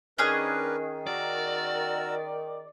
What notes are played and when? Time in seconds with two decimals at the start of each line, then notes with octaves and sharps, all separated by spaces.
0.18 D#3 C#4 D4 G#4 A#4 B4 F#6
1.07 F#4 A#4 D5 E6